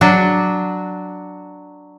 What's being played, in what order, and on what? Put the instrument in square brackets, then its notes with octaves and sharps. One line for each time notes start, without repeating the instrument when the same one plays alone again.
[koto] F#3 D4 F#4